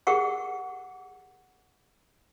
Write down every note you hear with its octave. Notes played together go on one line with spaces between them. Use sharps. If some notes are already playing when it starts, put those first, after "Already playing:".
G4 G#4 A#4 F#5 C#6